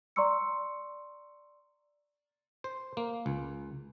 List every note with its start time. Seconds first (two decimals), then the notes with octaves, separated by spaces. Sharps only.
0.16 D5 A#5 C6 C#6 E6 C#7
2.64 C5
2.97 A#3
3.26 C#2